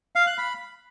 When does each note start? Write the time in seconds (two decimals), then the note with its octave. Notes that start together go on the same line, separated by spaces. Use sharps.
0.16 F5
0.27 F#6
0.38 B5